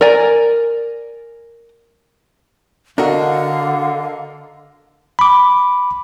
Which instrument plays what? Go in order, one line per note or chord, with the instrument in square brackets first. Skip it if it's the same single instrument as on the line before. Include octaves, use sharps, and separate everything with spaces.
[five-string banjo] A#4 D5 G#5
[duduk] D3 [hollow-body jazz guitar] D4 F#4 [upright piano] A4 A#4 D#5 [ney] F5
[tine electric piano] B5 D6